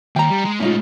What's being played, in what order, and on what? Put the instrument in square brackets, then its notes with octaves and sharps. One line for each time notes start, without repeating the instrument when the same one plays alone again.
[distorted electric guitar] D#2 [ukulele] G5 A#5
[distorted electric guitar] G3
G#3
[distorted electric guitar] A2 G#3 [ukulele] C#4 D#4 F4